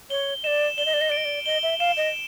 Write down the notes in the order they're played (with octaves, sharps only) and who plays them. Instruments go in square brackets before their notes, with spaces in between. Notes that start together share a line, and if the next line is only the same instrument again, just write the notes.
[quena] C#5 [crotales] G7
[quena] D5 D#5 [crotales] E7
[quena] D5 [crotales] G7
[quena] D#5
D5
D#5
[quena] D5 [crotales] D7
[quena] D#5
D5
[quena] D#5 [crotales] G7
[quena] E5
[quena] F5 [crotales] E7
[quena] D#5